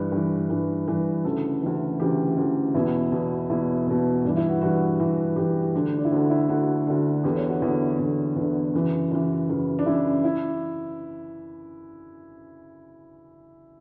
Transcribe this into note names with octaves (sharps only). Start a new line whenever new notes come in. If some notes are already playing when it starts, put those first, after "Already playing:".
Already playing: G2 E3 B4
G2 E3
G2 E3
G2 E3
D2 C#3 E3 A4
D2 C#3 E3
D2 C#3 E3 G4
D2 C#3 E3
E2 B2 E4
E2 B2
E2 B2 E4
E2 B2
G2 E3 D4
E4
F#4
G2 E3 F#4
G2 E3
G2 E3 G4
D2 D3
D4
E4
D2 D3 F#4
E4
D2 D3 F#4
D2 D3
E2 D3 G4
C#5
F#4
E2 D3 E4
E2 D3
E2 D3 E4
F#2 C#3 E3
F#2 C#3 E3 E4
F#2 C#3 E3
D4
F#2 C#3 E3 E4
E4